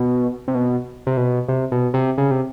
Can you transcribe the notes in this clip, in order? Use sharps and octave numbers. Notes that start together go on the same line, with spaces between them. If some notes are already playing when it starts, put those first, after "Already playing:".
Already playing: B2
C3
B2
C3
B2
C3
B2
C3
C#3
C3